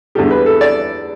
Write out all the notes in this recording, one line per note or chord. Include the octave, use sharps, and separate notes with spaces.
E2 D3 G3 G4
B4
A4
D5